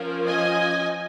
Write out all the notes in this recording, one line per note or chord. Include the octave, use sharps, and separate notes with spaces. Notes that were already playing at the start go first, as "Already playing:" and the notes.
Already playing: F3 C#4 A#4
D#5 G#5